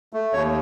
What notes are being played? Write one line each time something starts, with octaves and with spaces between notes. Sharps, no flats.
A3
D#2 C#5